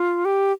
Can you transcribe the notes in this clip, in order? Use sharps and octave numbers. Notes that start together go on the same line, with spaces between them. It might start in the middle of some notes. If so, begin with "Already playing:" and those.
Already playing: F4
G4